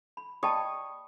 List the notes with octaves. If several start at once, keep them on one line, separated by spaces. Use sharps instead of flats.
B5
D5 D#5 G5 A5 B5 C#6 D#6